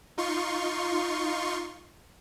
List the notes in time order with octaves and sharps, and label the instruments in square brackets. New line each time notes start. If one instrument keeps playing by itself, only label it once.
[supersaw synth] D#4 F4 C6 C#6